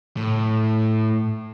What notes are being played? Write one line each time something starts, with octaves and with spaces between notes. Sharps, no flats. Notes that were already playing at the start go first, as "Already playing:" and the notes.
A2